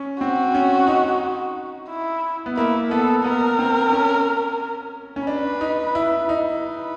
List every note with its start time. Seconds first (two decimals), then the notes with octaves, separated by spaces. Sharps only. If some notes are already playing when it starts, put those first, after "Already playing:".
Already playing: C#4
0.20 C4 F#4
0.54 C#4
0.87 D#4
1.89 E4
2.46 B3
2.57 A#3 E4
2.91 B3 A4
3.24 B3 A#4
3.59 C4
3.92 C#4
5.16 C#4
5.27 D4 B4
5.61 D#4
5.95 E4
6.29 D#4
6.62 B4